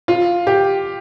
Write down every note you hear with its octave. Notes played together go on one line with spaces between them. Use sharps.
F4
G4